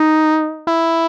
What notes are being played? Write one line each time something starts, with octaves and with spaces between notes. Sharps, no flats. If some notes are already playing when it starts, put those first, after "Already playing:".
Already playing: D#4
E4